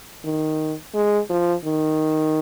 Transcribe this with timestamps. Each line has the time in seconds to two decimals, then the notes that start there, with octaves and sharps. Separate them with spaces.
0.25 D#3
0.95 G#3
1.30 F3
1.65 D#3